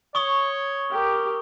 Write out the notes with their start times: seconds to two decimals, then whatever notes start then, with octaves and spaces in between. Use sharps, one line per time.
0.15 C#5 C#6 D#6 G7
0.90 G4 A#4